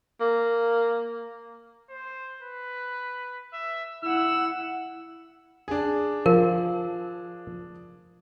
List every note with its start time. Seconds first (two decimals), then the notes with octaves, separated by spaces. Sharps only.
0.20 A#3
1.89 C5
2.41 B4
3.53 E5
4.03 E4 F#5 E6
5.68 D4 G#4
6.26 F3 A#4